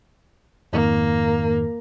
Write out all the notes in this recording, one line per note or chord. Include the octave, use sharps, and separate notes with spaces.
F2 G#2 D#3 A#3